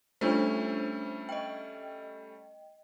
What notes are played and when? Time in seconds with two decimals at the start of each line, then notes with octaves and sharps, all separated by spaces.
0.21 G3 A3 C#4 D4 F4 C5
1.29 D#5 G5